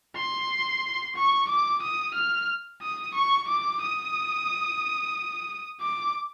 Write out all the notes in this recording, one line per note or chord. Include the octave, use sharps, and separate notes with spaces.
C6
C#6
D6
D#6
F6
D#6
C#6
D6
D#6
D6